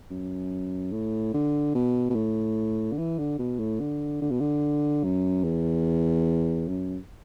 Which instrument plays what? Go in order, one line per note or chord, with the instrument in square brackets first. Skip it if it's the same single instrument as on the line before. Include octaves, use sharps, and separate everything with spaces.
[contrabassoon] F#2
A2
D3
B2
B2
A2
D3
E3
D3
B2
A2
D3
D3
B2
D3
F#2
E2
F#2